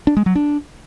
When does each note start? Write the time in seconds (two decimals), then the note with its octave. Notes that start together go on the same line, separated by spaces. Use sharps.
0.07 D4
0.17 G#3
0.26 F#3
0.35 D4